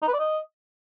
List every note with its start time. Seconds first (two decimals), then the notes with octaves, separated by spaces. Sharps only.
0.02 D#4
0.08 B4
0.14 D5
0.19 D#5